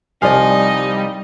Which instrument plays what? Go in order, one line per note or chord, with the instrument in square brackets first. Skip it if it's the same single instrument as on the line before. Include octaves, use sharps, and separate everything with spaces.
[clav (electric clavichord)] C2 F3 F5 [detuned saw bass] G3 [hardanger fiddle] D#4 D#5 [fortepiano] D5 G#5